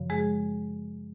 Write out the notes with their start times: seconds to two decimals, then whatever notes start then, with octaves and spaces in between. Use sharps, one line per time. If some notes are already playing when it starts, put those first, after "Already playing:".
Already playing: F#2 C#3 F3
0.10 G#3 G#4